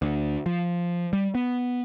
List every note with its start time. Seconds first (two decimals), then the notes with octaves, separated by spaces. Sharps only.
0.02 D2
0.46 F3
1.13 G3
1.35 B3